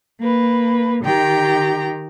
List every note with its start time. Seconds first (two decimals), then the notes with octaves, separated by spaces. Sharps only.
0.20 A#3 B4
1.02 D#3 G4 G5 A#5